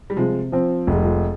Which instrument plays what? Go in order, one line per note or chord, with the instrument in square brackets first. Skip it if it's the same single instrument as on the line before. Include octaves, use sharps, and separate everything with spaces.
[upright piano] G3
[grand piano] C3 [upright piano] F3 G#3
[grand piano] F3 C4
[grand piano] F1 [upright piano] G#3
[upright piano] G3
F3 G#3